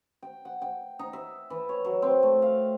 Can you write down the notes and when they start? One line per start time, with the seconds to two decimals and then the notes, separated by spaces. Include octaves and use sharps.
0.22 G5
0.45 F#5
0.62 G5
0.99 D#4
1.13 E5
1.50 E3
1.69 C#5
1.85 F#3
2.02 C4
2.23 A3
2.42 F5